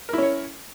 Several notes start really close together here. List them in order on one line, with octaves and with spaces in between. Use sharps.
A#4 E4 C#4 C#5